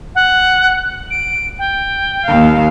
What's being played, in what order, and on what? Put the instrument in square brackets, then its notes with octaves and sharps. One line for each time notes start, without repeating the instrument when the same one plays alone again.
[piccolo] F#5
D7
G5
[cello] D#2 F5